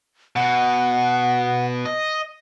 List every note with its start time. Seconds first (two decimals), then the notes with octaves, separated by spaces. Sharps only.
0.36 B2 F#5
1.86 D#5